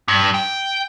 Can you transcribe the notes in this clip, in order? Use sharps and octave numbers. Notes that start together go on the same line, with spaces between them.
G2
G5